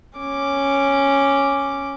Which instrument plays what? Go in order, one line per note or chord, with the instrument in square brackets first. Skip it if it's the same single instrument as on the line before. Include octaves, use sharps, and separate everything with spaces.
[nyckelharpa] C#4 D6